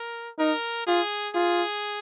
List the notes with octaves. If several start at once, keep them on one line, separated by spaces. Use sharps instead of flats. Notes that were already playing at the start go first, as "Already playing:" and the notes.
Already playing: A#4
D#4 A#4
F4 G#4
F4 G#4